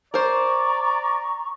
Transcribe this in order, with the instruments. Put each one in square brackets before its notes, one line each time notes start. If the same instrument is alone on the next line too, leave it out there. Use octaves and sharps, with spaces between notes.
[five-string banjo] A#4 C5 [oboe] D5 [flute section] A#5 C#6